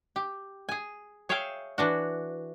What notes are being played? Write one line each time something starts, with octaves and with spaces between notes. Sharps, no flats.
G4
G#4 G#5
G#4 C#5 E5 F5 G5 G#5
E3 D4 F#4